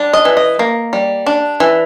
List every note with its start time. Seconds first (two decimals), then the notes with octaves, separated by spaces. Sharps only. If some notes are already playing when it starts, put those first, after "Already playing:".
Already playing: G3 D4
0.13 D#5
0.25 E3
0.37 D#5
0.59 A#3
0.93 G3
1.26 D4
1.60 E3